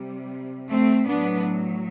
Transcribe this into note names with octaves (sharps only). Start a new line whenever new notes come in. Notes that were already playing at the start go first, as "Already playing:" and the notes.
Already playing: C3 G3
A3 C4
A2 F#3 B3 D4